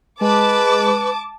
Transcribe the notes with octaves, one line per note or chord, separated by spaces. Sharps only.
G#3 B4 A5 D6